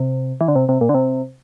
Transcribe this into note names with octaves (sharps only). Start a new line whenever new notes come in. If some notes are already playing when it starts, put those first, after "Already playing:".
Already playing: C3
E3
D3
C3
C3
A#2
D3
C3